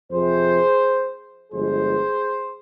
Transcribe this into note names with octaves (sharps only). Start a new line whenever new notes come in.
F2 C3 F3 G#4 C5
G1 G2 F3 G#3 G#4 C5